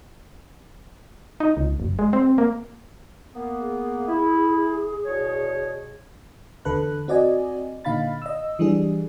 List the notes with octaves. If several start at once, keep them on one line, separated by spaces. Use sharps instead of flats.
D#4
C#2
F#1
G#3
C4
A#3
A#3 B3
G#4
E4
E2 B2 C#5
E2 D3 A4 B4 F#6
C4 F#4 D5 D#5 G#5
A#2 D3 D#4 F5 B5 A6
D#5 E6
E3 G3 D4 G#4